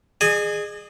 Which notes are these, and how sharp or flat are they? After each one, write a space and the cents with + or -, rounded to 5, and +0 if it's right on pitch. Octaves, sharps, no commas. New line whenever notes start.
G#4 +0 D#5 -45 G#5 +0